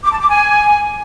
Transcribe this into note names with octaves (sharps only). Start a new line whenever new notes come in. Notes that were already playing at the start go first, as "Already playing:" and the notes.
D6
A5
D6
G#5